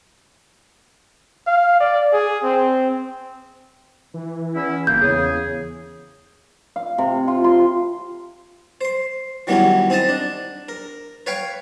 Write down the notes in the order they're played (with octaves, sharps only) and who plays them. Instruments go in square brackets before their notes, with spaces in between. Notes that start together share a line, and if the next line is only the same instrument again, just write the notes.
[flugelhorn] F5
D5
G#4
C4
[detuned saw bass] E3
[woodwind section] E2 C#4 E4
[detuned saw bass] G1 [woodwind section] A#3 [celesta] G6
[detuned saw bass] E2 [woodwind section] C#3 G#4
[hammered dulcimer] F5
C3
F4
C6
[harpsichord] C5 C6
D#3 E3 F#3 G3 B3 C#4
C4 D#4 D#5 A5
D4
A#4
B4 C#5 F5 G5